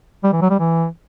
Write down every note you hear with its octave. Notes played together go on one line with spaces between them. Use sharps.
G3
E3
F#3
G3
E3